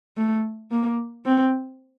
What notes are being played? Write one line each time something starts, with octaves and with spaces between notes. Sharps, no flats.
A3
A#3
C4